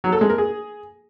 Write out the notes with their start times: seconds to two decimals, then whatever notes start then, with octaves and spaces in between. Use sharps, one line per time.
0.04 F#3
0.13 A4
0.21 G#3
0.30 A#4
0.38 G#4